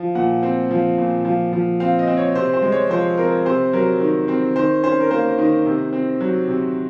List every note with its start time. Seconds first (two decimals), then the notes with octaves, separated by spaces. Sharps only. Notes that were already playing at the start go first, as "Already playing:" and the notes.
Already playing: F3
0.15 A#2 F#5
0.43 C4
0.71 F3
0.98 A#2
1.25 F3
1.53 F3
1.80 C4 F5
1.99 D#5
2.07 C4
2.17 C#5
2.35 C3 C5
2.54 C5
2.62 G#3
2.72 C#5
2.90 F3 C5
3.17 C4 A#4
3.46 C3 C5
3.73 F#3 A#4
4.00 D#3
4.28 C4
4.56 D#3 C5
4.83 C#4 C5
5.00 A#4
5.11 A#3 C5
5.38 D#3
5.66 C3
5.93 C4
6.21 F#3
6.48 C3